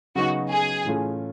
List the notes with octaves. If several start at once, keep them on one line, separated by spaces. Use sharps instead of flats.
C#3 F#3 B3 D#4 F#4
G#4
A2 E3 A3 C#4 F4